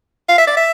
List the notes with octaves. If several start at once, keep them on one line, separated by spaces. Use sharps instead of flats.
F5
E5
D5
E5